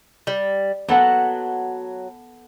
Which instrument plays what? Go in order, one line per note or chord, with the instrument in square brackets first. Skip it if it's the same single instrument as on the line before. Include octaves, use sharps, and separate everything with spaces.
[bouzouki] G3
[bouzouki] F#3 [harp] B3 A4 F#5